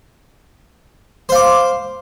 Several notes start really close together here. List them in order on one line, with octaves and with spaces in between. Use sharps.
C5 F5 D6